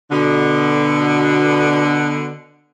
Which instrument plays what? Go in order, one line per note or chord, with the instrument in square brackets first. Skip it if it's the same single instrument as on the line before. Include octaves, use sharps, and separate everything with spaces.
[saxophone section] B2 D3